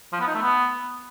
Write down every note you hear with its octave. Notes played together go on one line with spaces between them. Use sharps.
F3
B3
D#4
A3
B3